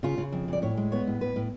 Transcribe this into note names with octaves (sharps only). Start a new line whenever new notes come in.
C#3 F4
C#3
F2
C#3 D5
A2 C#5
G#3
B3 C#5
A2
A2 B4
A2